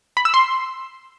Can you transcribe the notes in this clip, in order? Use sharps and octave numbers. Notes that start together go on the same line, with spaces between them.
B5
E6
C6